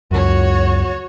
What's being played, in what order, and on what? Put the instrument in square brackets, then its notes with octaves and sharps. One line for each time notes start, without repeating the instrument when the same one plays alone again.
[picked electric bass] C#2 F#2 [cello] F#4 C#5